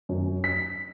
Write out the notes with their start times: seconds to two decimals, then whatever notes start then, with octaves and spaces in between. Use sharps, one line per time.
0.09 F#2
0.44 B6